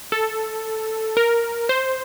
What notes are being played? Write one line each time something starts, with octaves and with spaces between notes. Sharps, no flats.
A4
A#4
C5